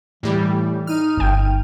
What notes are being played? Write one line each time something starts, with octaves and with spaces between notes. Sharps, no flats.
A2 E3 G3
D#4 F6 D#7
G1 G5